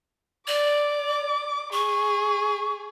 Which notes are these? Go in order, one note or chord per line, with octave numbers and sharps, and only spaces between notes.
D5 D6
G#4 C#6